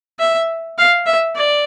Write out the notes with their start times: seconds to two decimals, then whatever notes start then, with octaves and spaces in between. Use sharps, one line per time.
0.20 E5
0.78 F5
1.06 E5
1.36 D5